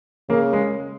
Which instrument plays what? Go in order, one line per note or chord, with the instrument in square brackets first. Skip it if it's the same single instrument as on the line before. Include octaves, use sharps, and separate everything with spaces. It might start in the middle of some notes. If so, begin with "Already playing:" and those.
[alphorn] C#3 [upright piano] A#3
[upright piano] G#3